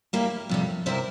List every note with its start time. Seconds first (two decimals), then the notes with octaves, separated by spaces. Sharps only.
0.13 G3 A#3 E4 G4
0.49 F2 C3 G3
0.86 C3 G3 C4 E4 A#4